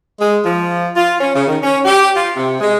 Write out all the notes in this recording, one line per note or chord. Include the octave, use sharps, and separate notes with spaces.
G#3
F3
F4
C#4
C#3
D#3
C#4
G4
F4
C3
G#3